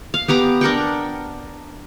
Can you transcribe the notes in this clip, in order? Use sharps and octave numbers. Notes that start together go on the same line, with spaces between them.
F5
B3 G4 A#5 D6
D4 A#4 F#5 G5